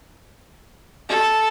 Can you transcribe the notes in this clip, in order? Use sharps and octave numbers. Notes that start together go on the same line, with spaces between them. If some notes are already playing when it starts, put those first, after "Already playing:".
A4